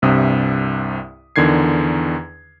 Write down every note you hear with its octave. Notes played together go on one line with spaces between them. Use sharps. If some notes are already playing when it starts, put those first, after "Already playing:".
C2 G2 C3 E5 D#6
E2 D3 D#3 G#6 C7